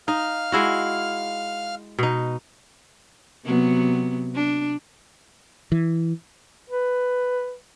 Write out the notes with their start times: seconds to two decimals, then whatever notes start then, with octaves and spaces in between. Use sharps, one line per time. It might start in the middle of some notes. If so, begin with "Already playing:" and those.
0.08 D#4 F5 F6
0.52 G#3 E4 F#4
1.99 B2 D#4
3.46 C3 F#3 B3
4.35 D4
5.72 E3
6.70 B4